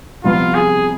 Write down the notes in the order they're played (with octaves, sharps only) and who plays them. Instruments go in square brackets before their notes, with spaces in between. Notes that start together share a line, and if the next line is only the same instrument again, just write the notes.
[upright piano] C2 C3 F3 B3 [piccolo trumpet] F4
[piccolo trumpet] G#4